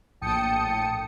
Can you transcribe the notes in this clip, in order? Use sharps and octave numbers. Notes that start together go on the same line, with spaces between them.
A#1 A2 G5 A5 D#6 C#7